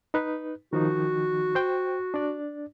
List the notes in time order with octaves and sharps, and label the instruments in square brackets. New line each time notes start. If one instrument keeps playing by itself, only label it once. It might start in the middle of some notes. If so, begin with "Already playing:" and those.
[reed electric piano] D#4 B4
[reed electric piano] D#3 F3 D#4 [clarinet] F#4
[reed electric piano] C5 G5
D4 D5